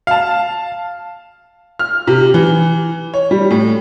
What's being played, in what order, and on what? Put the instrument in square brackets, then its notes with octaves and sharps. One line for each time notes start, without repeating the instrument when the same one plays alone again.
[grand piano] F5 A5
[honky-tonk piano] F6
C3
E3
C#5
G3
A2